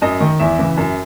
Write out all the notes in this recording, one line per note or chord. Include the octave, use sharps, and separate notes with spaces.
F#2 D#5
D#3
E2 E5
C#3 E3
F#2